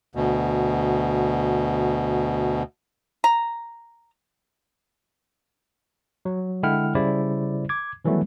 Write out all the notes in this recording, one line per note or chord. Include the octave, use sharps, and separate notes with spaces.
D2 B2
A#5
F#3
D3 G#3 E4 F#5 G5 F6
C#3 G3 E4 C5 D5
D6 G#6
D#3 E3 F#3 G3 A3 B3